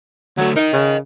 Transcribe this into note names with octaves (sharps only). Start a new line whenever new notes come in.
D2 F#3 A3
D#4 A#4 D#5
C#3